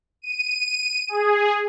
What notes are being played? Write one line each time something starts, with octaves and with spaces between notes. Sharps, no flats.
D#7
G#4